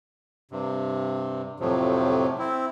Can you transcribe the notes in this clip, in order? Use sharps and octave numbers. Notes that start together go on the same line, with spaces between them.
G2 C3
F2 A2 C3 F3 F#3
C4 E4